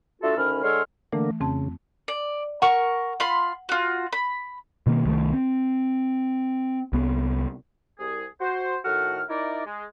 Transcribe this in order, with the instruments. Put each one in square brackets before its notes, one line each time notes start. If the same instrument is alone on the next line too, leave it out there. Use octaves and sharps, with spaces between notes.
[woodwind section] A3 D4 F4 F#4 A4
D2 D#3 C#4 B5 F6
D3 G#3 C#5 C6 E6 F6
[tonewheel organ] D3 A#3 [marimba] E3 A3
[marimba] F2 C4 A5 [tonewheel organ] C#3
[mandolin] D5
[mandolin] A#4 C#6 [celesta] F#5
[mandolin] F4 B5 C6
F4 F#4
B5
[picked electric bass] B2 D#3 A#3
C2 D#3 F3 A3
C4
C2 B3
[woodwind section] C2 G#4
F#4 C5
A2 D#3 F#4 A4 F#5 F6
D#4 E4 A#4 D5
G#3